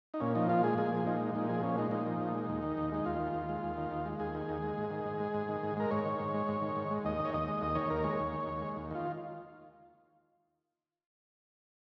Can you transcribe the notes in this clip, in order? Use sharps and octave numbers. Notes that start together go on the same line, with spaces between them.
D#4
A#2 C#4
F3 D#4
A#2 F4
G#3 G#4
A#2 G#4
F3
A#2 D#4
G#3
A#2 D#4
F3 G#4
A#2 C#4
G#3 D#4
A#2 D#4
F3
A#2
G#3
D#2
D#3
D#2
G#3 D#4
D#2 F4
D#3
D#2
G#3
D#2
D#3
D#2
G#3
D#2 G#4
D#3
D#2
G#3
G#2
D#3
G#2
G#3
G#2
D#3
G#2
G#3 A#4
G#2 C#5
D#3
G#2
G#3
G#2
D#3
G#2
G#3
D#2 D#5
D#3
C#5
D#2 D#5
G#3
D#2 D#5
D#3 C#5
D#2 A#4
G#3 C#5
D#2
D#3
D#2
G#3
D#2
D#3 F4